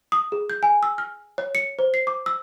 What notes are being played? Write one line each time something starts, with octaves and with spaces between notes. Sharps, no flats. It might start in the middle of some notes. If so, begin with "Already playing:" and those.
D#6
G#4
G6
G#5
E6
F6
C#5
C#7
C5
C7
D6
E6